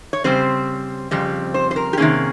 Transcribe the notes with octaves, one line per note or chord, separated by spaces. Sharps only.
C#5
C#3 G3 C4 C5
F2 C#3 G3 C4
C5
C5
A#4
G4
C3 D#3 A#3 C#4 G#4